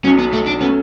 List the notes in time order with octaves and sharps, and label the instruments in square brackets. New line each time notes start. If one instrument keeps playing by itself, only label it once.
[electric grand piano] B1 B2 F#3 [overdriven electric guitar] C#4
[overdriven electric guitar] B3
A3
D4
[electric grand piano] F#3 A3 C#4 [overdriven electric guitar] B3